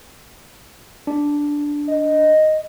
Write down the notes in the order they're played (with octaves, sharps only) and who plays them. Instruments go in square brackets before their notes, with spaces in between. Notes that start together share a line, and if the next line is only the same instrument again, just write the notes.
[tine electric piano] D4
[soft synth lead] D#5